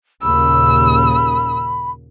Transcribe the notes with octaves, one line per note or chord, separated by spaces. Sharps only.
D#2 A#2 C#3 B5 E6